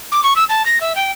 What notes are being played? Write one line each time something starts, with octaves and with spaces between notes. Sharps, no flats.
D6
C#6
E6
A5
A#6
E5
G5